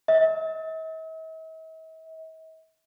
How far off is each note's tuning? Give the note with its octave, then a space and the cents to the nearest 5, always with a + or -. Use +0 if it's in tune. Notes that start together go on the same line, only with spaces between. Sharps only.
E5 -45